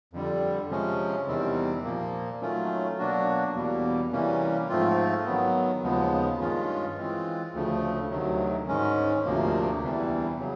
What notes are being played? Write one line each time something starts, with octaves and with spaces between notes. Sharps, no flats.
F2 D3 G3
C3 F3 G#3 C#4
E2 C3 D#3 G3 C4
A#2 F3 A#3
D#3 F#3 A3 C#4 F4
B2 F#3 A#3 D4 F#4
E2 B2 G3 A#3
C3 E3 G3 A#3 C#4
G#2 F3 A3 C4 F4
D#3 F#3 B3
D#2 C#3 F3 G#3 B3
G2 D#3 G#3 C#4 F4
E3 G#3 C4 F4
D2 C#3 F3 A3
D2 C3 D#3 F#3
G#2 D#3 G#3 C#4
D2 C3 F3 A#3
E2 C3 E3 G3
C#3 F#3